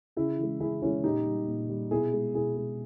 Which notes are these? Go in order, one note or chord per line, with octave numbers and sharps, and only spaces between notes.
C#3 E4 G#4
E3 G#3
C#3 E4 G#4
E3 G#3 C#4 E4
A#2 D#4 G4
G3
A#2
G3
B2 E4 G#4
G#3
B2 E4 G#4
G#3